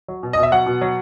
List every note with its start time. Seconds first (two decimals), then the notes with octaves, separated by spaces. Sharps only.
0.08 F#3
0.23 B2
0.33 D#5
0.37 B2
0.43 E5
0.52 F#3 F#5
0.66 B2
0.81 F#3